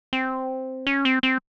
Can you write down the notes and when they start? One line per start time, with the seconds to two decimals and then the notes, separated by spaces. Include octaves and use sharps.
0.13 C4
0.87 C#4
1.05 C4
1.23 C4